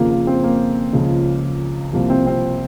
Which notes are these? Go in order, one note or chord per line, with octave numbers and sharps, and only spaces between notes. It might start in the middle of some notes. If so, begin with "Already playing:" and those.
Already playing: F2 C#3 F3 A#3
A#3
C4
A#3
C#2 C#3 F3
C2 C3 F3 A#3
C4
C4